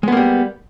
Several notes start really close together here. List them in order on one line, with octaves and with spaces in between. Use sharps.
G#3 B3 A#3 G3